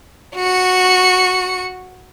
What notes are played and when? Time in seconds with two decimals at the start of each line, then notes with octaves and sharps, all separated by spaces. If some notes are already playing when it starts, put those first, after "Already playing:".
0.36 F#4 C#7